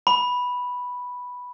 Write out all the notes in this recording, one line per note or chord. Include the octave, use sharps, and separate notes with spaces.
B5